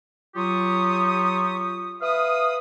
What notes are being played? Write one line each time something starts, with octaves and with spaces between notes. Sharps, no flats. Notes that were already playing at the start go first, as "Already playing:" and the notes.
F#3 F4 G4 C#6 D#6
B4 E5 F5 D#6